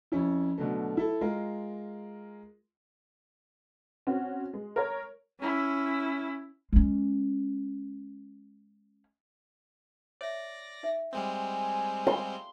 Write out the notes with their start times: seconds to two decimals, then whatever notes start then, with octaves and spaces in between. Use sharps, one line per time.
0.12 F2 C#4 E4
0.58 B2 D3 F#3 A3
0.97 E4 A4
1.21 G#3 F4 A#4
4.07 C4 C#4 F#4
4.53 G#3
4.76 A#4 C#5
5.39 C#4 E4
6.72 G#3 C#4
10.21 C#5 D5 E5 A#6
10.83 D#4 E5
11.13 G3 G#3 C4 G#5
12.07 G4 C6